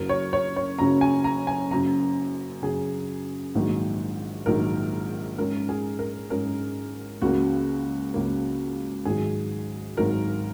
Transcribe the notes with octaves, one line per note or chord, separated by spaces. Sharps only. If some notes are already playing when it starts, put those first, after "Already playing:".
Already playing: F#1 F#2 C#3 F#3 A#4
C#5
C#5
C#5
F#1 F#2 C#3 F#3 A#5
G#5
A#5
G#5
F#1 F#2 C#3 A#5
F#1 F#2 C#3 G#4
A#1 G#2 D#3 F#3 A#3
A#1 G#2 D#3 F#3 A#3 A#4
G#2 G#3 C#4 A#4
G#4
A#4
G#2 G#3 C#4 A#4
C#2 C#3 A#3 F#4
C#2 C#3 A#3
G#1 G#2 D#3 F#3 G#4
G#1 G#2 D#3 F#3 A#4